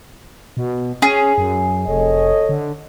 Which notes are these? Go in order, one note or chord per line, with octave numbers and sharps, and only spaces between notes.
B2
C#4 G#4
F#2
F1 A4 C#5 D#5
D3